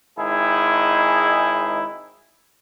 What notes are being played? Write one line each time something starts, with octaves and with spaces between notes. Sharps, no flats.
G#1 G#3 D#4 E4 G#4